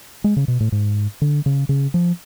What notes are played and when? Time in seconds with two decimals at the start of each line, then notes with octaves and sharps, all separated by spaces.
0.24 G#3
0.36 C#3
0.48 B2
0.60 A2
0.72 G#2
1.21 D3
1.46 C#3
1.69 C#3
1.94 F3